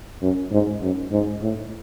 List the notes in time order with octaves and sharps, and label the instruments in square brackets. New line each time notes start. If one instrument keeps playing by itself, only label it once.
[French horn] F#2
G#2
F#2
G#2
A2